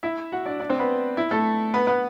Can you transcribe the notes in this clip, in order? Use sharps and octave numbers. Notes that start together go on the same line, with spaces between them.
E4 E5
F#4 F#5
D4 D5
D4 D5
C4 C5
B3 B4
E4
A3 A4
B3 B4
B3 B4